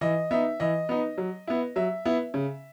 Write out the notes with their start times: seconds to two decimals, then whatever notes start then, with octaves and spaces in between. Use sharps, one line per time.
0.01 E3 D#5
0.31 B3 D#4 E5
0.60 E3 D#5
0.89 B3 D#4
1.18 F#3
1.47 B3 E4
1.76 F#3 E5
2.05 B3 E4
2.34 C#3